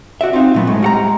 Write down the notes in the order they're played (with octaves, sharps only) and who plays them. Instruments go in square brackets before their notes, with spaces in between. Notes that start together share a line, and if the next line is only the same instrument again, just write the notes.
[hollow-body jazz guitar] F#4 D5 E5
[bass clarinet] C4 [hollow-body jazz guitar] D#4 F4
[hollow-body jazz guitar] A#2 F#3 B3 [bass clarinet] A3
[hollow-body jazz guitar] A2 [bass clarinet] G#3
[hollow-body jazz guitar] G3 F#5 A#5
[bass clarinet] G#3